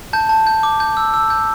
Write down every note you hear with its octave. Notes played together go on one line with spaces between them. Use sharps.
A5 G6
A5
G6
D6
G6
E6
E6
G6